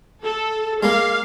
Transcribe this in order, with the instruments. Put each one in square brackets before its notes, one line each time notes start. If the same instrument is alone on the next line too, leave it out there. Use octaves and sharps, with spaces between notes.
[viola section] A4
[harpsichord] G#3 A#3 [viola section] F5